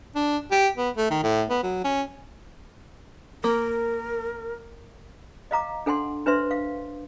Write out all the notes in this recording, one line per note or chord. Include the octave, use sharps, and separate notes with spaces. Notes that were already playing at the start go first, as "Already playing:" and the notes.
D4
G4
B3
A3
D#3
A2
B3
F#3
C#4
A#3 A#4
D#5 F5 A#5 D6
D4 A4 F#5 G#5 C6
D4 B4 C5 E5 C6
F5